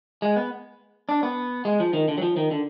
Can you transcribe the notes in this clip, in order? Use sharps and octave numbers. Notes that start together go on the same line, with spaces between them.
G#3
B3
D4
B3
G#3
F3
D#3
D3
F#3
F3
D#3
D3